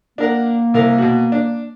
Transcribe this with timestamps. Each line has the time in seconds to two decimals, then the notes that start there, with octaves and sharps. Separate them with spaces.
0.18 A#3 D4 A#4 F#5
0.74 C2 A#4 F5
0.98 B2 F#4
1.32 D4